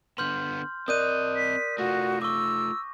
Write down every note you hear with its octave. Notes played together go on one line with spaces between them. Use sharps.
D3 B3 C6 F6 G6
C4 A#4 D5 D#5 D#6 F#6 G6 D#7
B6
A3 F4 F#4 A#6
C#6 D6 E6